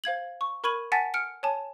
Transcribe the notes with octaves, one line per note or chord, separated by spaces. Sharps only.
C5 F5 G#6 F#7
C#6
A#4 B5 C#6 G#6 D#7 F#7
F#5 G#5 A5 A6 B6
F6 C#7 D7
C#5 G#5 A5